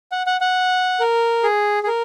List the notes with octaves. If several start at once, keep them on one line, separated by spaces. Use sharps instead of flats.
F#5
F#5
F#5
A#4
G#4
G#4
A#4